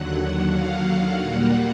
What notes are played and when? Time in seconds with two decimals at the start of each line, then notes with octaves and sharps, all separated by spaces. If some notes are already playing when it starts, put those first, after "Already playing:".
Already playing: D#2 D3 F#3 F#5
0.48 F5
1.17 A#2 G3 A#3 F#5